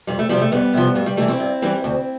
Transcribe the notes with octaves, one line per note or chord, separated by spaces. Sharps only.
F2 G3
A3
C3 F3 G3
A3
F2 G3 B3
C3 F3
G2 A3
G3
E3 G3 A3
C4 E4
G2
E3 G3
D2